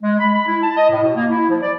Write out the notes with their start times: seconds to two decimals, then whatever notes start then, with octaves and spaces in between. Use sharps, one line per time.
0.03 G#3
0.20 B5
0.35 B5
0.48 E4
0.63 A5
0.77 D#5
0.90 A2
1.03 B2
1.16 A#3
1.30 E4
1.50 F3
1.62 D5